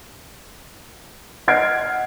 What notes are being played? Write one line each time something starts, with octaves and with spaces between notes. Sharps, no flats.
D#5 F#5 F6 G#6 C7 D7